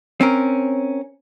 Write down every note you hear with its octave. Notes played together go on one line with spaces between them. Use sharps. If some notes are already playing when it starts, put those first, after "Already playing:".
C4 C#4 A#4